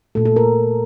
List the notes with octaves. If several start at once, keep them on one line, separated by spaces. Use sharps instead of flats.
A#2 A3 A4
A4
A#4